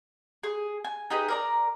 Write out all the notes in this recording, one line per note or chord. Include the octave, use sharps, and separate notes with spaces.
G#4
G#5
D#4 G4 G#4 B4
A#4 D5 A#5